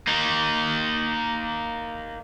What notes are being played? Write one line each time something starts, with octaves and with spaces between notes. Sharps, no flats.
A#3 D#4